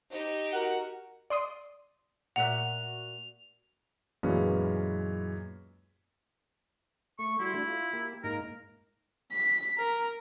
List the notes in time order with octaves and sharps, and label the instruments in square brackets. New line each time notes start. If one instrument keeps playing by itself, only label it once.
[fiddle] D#4 G4
[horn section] F#4 A#4 F#5
[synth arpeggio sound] D5 C6 D#6
[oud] A#2 F#4 E5 [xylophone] F#5 [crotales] F7
[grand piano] F#2 A#2 E3 G#3 B3 C#4
[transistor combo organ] A3 [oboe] C#6
[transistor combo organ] G3 F#4 C6 [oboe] E4
[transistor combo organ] A3 D4 F#4
F4
A#3 G4
[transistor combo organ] G#2 A#3 D#4 [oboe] A#4
[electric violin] B6
A#4